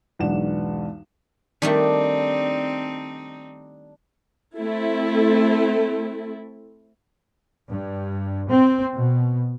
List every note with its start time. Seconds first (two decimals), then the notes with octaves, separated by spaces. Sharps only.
0.19 B1 E2 G#2 D4 F#5 E7
1.62 D#3 G3 A3 C4 D4 D#4
4.57 A3 C4 E4 A4
7.68 G2
8.49 C4
8.94 B2